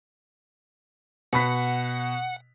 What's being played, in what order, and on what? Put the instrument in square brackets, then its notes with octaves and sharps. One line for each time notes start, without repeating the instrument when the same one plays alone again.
[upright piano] B2 B5 B6 [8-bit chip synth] F#5